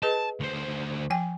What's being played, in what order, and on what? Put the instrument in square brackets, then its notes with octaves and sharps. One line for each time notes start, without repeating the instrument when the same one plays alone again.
[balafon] G#4 B4 D#5 [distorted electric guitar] A5
[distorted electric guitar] D2 C5
[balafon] F3 G5 G#5